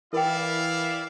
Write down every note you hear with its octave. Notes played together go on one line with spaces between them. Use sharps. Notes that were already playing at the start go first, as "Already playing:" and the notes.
E3 E4 A#4 D5 F5 G5